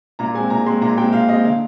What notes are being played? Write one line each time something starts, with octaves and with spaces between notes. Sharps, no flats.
A#2 A#5
G#3 C4 G#5
A#2 A#5
G#3 C4 C6
A#2 A#5
G#3 C4 G5
A#2 F5
G#3 C4 D#5
D3 F5